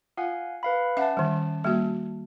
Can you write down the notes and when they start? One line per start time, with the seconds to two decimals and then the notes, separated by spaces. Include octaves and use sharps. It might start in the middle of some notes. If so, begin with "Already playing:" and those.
0.17 F4 F5 F#5 G#5
0.63 B4 F5 B5
0.97 C#4 E5 F#5 A5
1.17 D#3 G3
1.64 G3 A#3 F#4